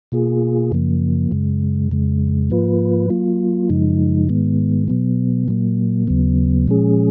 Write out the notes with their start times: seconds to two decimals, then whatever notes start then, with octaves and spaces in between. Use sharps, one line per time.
0.12 B2 A#3 F4 G#4
0.72 F#2 C#3 F3 A#3
1.31 F#2 C#3 G#3
1.91 F2 C#3 G#3
2.50 G#2 F3 A#3 F4 B4
3.10 F#3 A#3 F4
3.69 F#2 C#3 F3 G#3 D#4
4.29 G#2 D#3 G#3 B3
4.88 B2 F#3 B3
5.48 A#2 F#3 A#3
6.07 D#2 C#3 F#3 B3
6.68 A#2 F3 G#3 C#4 G#4